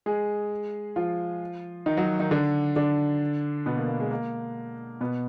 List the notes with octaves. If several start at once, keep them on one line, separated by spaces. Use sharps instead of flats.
G#3 G#4
F3 F4
D#3 D#4
F#3 F#4
D#3 D#4
D3 D4
D3 D4
B2 B3
A#3
A#3
G#3
A#3
B2 B3